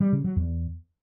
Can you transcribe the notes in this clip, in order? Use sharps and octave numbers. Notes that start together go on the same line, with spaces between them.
G3
C#3
F#3
E2